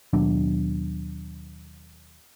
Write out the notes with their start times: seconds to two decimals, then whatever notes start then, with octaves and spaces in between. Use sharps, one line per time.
0.13 D#2 B2 F#3 D4